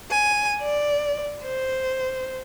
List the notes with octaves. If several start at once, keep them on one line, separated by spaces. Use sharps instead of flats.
G#5
D5
C5